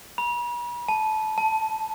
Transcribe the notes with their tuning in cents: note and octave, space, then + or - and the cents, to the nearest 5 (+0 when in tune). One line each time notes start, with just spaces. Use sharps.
B5 -45
A5 -20
A5 +0